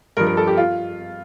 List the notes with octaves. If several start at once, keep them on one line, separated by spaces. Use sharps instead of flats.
G2 F3 A#4
A#4
A4
G4
F4